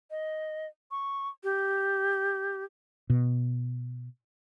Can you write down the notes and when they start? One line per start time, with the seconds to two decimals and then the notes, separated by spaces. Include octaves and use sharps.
0.11 D#5
0.91 C#6
1.44 G4
3.10 B2